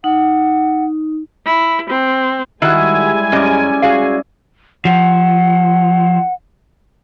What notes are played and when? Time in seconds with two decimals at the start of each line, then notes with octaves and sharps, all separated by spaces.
0.04 D#4 F#5
1.45 E4
1.90 C4
2.62 D#3 G3 G#3 E4 F#4 G#5
3.32 F#2 C#4 D5 D#5
3.82 F#4 G#4 F5
4.85 F3 F#5